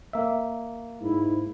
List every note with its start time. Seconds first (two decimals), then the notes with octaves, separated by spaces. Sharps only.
0.13 A#3 E5
1.01 G#2 E4